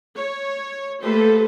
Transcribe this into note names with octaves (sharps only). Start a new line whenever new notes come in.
C#5
A3 A#3 G4 A4 B4 C5